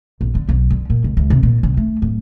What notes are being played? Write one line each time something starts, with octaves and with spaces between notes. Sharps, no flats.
A#1
D3
B1
D3
A#2
C#2
C#2
C3
A#2
C2
A3
D1